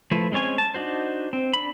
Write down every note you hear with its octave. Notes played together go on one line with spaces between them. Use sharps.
F3 A3 E4 B4
G#3 C4 C#4 C#5 G#5
A5
D4 D#4 F#4 C5
C4
D4 B5